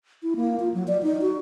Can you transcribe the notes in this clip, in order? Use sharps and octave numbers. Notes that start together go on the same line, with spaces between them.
E4
A#3
F4
F#3
D5
D#4
F#4